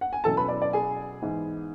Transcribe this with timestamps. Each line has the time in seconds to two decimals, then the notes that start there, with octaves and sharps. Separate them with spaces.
0.01 F#5
0.13 G#5
0.24 B2 F#3 C#4 E4 A4 A5
0.37 B4 B5
0.48 D5
0.62 D5
0.73 G#4 G#5
1.22 G#2 E3 B3 E4